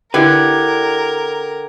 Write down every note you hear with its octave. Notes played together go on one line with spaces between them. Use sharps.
D3 E4 G4 A#4 B4 G5 G#6